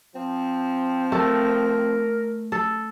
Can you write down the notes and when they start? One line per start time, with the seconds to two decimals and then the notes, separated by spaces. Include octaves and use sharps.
0.15 F3 C4
1.12 A3 A#4
2.52 A4